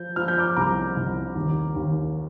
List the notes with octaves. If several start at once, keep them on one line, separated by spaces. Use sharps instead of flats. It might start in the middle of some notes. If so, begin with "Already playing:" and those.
Already playing: F3 G6
F3 F6
G6
D6 F6
C2 A#5 D6
C2
D#2
D#2